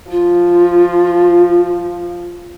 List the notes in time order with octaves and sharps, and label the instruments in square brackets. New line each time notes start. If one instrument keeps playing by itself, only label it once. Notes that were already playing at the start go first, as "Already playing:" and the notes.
[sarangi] F3 [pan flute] F4